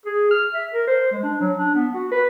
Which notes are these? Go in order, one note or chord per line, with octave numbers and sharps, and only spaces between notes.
G#4
F6
E5
A#4
C5
G#3
D4
F#3
D4
B3
F#4
B4